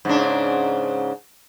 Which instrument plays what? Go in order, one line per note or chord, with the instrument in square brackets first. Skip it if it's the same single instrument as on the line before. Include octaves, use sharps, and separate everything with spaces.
[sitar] G#2 C#3 D4